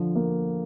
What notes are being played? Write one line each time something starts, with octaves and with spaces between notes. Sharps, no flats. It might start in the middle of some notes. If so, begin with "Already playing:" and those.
Already playing: D3 F3
A#3